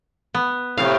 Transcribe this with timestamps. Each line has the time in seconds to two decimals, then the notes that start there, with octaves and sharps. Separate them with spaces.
0.34 B3
0.77 A2 C3 F5